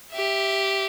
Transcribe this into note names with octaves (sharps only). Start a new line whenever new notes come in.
G4 E5